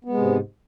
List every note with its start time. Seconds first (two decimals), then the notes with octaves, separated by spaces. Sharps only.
0.05 B3
0.09 G#3
0.14 C3
0.19 G#2